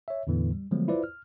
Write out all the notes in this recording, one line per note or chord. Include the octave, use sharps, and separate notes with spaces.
C#5 E5
E2 A2 D3 E3 B3
G3
D3 F3 F#3 G#3 A3 B3
E4 F4 B4 C5 D5
F6